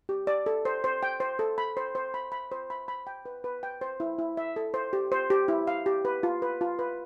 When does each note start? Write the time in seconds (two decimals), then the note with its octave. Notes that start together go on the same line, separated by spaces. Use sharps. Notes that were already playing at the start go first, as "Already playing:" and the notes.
0.09 G4
0.27 D5
0.46 A4
0.65 C5
0.84 C5
1.03 G5
1.20 C5
1.39 A4
1.58 B5
1.77 C5
1.95 C5
2.14 B5
2.32 B5
2.52 C5
2.70 B5
2.88 B5
3.07 G5
3.26 B4
3.44 B4
3.63 G5
3.81 C5
4.00 E4
4.19 E4
4.37 E5
4.56 A4
4.74 C5
4.93 G4
5.12 C5
5.30 G4
5.48 E4
5.67 F5
5.86 G4
6.05 B4
6.23 F4
6.42 B4
6.61 F4
6.79 B4